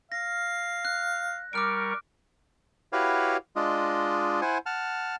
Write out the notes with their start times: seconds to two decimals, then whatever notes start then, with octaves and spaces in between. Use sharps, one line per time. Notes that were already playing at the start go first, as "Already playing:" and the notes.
0.12 F5 A#6
0.85 F#6
1.53 G3 A#4 C#6 D6 F6 D7
2.93 E4 F#4 G4 B4 C#5 F5
3.56 G#3 D4 F4 D#5
4.42 E4 C5 F#5 G#5
4.66 F#5 A5 F6